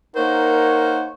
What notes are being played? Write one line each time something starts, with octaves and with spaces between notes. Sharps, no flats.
A#3 D#4 A#4 C5 C#5 F#5